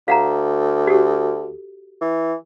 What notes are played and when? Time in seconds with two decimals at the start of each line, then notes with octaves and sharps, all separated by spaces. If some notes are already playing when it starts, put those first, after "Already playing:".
0.08 D2 F5 F#5 A#5
0.87 F#4 G4 A4
2.01 E3